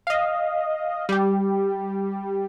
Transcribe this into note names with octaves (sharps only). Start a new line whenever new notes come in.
D#5 F5
G3 G4